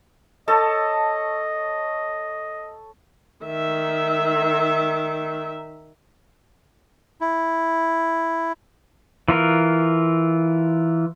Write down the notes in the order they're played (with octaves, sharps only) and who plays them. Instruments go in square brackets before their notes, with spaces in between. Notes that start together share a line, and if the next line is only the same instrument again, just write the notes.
[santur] A4 C#5 A5 [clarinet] D#5
[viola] D#3 E5
[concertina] E4
[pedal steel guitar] E3 F4 A#4